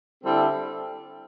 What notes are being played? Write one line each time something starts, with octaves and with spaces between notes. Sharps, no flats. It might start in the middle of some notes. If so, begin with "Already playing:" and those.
D3 G3 C4 E4 A4